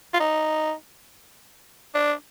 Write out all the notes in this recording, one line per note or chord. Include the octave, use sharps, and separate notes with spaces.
F4
D#4
D4